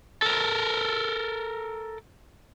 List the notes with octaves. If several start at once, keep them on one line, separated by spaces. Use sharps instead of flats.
A4 A#4